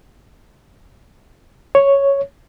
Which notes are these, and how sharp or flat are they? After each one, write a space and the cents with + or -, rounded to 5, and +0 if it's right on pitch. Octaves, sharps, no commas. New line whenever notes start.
C#5 +0